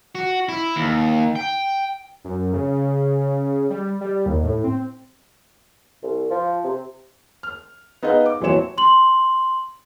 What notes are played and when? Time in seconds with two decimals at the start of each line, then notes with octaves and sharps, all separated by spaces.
0.15 F#4
0.49 E4
0.76 D#2
1.36 G5
2.25 F#2
2.53 C#3
3.70 G3
4.01 G3
4.26 D#2
4.43 A2
4.64 C4
6.03 C2
6.30 F3
6.64 C3
7.43 F6
8.03 B3 D#4 G#4 D#5 F5
8.26 D6
8.41 D#1 E3 F#3 C4 C#5 E7
8.78 C6 F#7